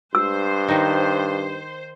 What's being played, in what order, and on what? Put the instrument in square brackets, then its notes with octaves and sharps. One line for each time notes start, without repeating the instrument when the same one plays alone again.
[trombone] G2 [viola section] C5 [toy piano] E6
[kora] D#3 D#4